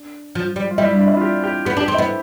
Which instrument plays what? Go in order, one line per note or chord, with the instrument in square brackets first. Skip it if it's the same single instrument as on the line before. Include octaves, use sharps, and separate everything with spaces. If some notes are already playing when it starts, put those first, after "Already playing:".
Already playing: [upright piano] D4
[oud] F3
G3
[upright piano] F4
[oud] G3 [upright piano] E4
[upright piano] D4
E4
F4
G4
G4
[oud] B3 [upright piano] G4
[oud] D4
[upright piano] G4
[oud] C4
[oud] B3 [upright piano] E4